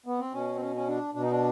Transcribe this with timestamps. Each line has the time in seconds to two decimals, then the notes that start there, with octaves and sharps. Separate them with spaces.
0.06 B3
0.19 C4
0.33 B2 C#4
0.55 C4
0.61 C#4
0.76 C#4
0.87 D4
1.15 B2 D4
1.23 D#4
1.31 D4